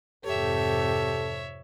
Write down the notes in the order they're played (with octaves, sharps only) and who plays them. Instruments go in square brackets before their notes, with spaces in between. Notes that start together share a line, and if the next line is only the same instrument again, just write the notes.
[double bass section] F2 G#2 C3 [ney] G4 [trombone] A4 [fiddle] C#5 E5